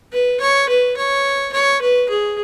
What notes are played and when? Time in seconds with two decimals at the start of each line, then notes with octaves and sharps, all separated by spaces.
0.13 B4
0.41 C#5
0.69 B4
0.97 C#5
1.53 C#5
1.81 B4
2.09 G#4